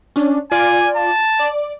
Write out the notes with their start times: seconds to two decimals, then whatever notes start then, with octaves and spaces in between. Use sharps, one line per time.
0.16 C#4 D4
0.52 F4 D5 G#5
0.96 A5
1.39 D5